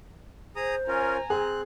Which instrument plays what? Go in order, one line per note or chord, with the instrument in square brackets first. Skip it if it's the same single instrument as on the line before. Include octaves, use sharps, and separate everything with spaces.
[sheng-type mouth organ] G#4 A#5 D#6 [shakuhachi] C5
[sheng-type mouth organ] C#4 F4 A#4 [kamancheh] G#5 A#5
[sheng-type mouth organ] C4 F#6 [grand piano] G#4